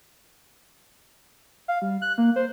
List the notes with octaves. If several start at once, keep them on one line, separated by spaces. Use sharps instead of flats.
F5
G3
F#6
A#3
C5